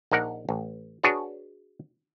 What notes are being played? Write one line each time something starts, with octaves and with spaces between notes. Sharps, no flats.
A#1 D#4 A#4 F#5
A1
D4 F#4 G#4 B4 C#5